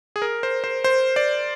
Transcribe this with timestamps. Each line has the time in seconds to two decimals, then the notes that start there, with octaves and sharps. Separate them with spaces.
0.16 G#4
0.22 A#4
0.43 C5
0.64 C5
0.84 C5
1.16 D5